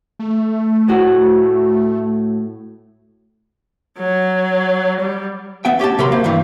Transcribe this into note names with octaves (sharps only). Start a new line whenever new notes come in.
A3
A2 F#4
F#3
G3
B3 E5 G5
C#4 G4 D#5 A5
C3 F#3 G4 A#4 B5 C6
A#3 C5
G2 D#3 E3